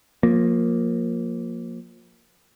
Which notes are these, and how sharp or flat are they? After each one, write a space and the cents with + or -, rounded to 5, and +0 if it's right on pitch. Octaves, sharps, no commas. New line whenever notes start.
F3 +30 A#3 +0